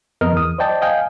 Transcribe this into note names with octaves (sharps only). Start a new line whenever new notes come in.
F2 B3 A#4 D#5 F6
E2 D#6
C5 D5 D#5 G5 A5
D#5 F5 G5 G#5